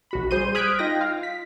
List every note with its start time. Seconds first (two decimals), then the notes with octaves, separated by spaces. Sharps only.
0.11 A#1 F#4 B5
0.31 G3 G#4 C5 C6 G6 D#7
0.55 D#6 F6 F#6 G#6 B6 D7
0.79 D#4 F4 G5 A#6
1.01 F4 F5
1.23 B6